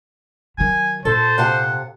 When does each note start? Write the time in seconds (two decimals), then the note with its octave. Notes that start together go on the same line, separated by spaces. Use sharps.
0.58 D#3 F#3 G#5
1.05 A#2 A4 C5 A5
1.38 C3 F5 F#5 A5